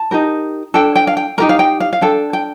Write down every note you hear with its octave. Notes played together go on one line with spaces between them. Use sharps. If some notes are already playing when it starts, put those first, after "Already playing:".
Already playing: A5
D#4 G4 A#4
D4 A4 G5
G5
F5
G5
D#4 G4 A#4 A#5
F5
G5
F5
F5
D4 A4 G5
G5